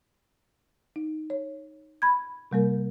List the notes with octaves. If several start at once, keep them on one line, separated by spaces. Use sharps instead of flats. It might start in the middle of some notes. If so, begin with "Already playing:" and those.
D#4
C#5
B5 G#6
C3 G3 A#3 A#4